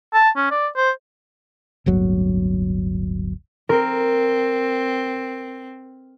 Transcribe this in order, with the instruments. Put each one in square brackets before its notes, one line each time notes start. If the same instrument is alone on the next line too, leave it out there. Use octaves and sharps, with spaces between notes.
[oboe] A5
C#4
D5
C5
[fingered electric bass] D1 G1 F#3
[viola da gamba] C4 [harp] A#4